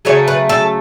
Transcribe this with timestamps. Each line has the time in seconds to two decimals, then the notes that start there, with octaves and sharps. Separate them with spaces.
0.05 C#3 F#3 A3 C#5
0.28 B4
0.49 A4